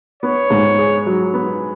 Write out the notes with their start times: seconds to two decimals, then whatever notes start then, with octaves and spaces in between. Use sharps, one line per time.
0.22 B3 C#5
0.50 G#2
0.78 G#4
1.06 F#3
1.34 B3